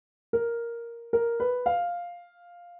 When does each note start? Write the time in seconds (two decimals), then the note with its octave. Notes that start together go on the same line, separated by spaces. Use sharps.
0.33 A#4
1.13 A#4
1.40 B4
1.66 F5